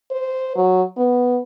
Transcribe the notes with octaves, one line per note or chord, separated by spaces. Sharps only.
C5
F#3
B3